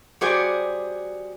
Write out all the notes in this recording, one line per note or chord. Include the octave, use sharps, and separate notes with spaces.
G3 F#4 G#4 C5 D5